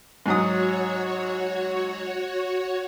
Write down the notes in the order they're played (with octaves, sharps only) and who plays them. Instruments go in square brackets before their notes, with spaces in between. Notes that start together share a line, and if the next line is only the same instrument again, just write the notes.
[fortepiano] G#2 F#3 D#6 [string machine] F#4 C#5